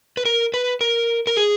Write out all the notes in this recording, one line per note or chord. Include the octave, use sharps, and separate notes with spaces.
B4
A#4
B4
A#4
A#4
G#4